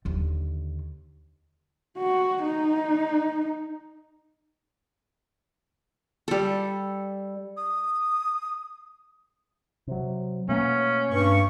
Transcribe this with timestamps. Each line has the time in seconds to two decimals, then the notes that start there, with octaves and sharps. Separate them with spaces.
0.05 D#2 D3
1.98 F#4
2.43 D#4
6.28 G3 A4
7.56 D#6
9.87 C3 F#3
10.49 B2 A3 A#3 C#4
11.12 G2 C#6